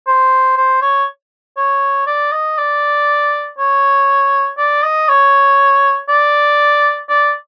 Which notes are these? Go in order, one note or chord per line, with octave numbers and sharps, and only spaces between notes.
C5
C5
C#5
C#5
D5
D#5
D5
C#5
D5
D#5
C#5
D5
D5